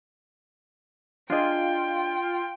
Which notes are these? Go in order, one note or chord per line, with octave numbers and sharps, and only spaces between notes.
D4 F4 G#4 D#5 G5